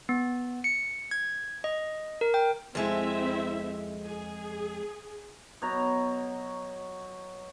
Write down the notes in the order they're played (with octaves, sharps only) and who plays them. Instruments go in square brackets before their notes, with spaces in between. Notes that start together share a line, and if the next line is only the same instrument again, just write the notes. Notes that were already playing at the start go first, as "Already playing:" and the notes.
[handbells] B3
C#7
G#6
D#5
A#4
G5
[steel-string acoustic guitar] F2 G#3 [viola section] C4 E4 E5
[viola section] G#4
[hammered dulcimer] B2 F#3 C#5 A#5